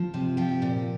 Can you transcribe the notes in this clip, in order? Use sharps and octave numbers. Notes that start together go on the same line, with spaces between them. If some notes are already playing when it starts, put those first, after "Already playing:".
Already playing: F3
C3
F3 G4
A#2